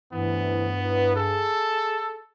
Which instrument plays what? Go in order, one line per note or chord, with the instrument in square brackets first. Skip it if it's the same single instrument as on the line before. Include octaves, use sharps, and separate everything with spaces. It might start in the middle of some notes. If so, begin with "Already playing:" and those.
[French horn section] D2 C3 E3 [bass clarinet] G2 [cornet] B3
[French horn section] F#3 E4 B4
[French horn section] G#4 [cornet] A4